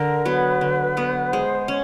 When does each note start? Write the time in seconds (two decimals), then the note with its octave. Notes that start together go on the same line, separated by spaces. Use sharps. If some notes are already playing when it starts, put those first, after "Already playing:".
Already playing: D3 A#4
0.25 F#3 B3 B4
0.61 D3
0.97 F#3 B3
1.33 G#3 C5
1.68 C#4 C#5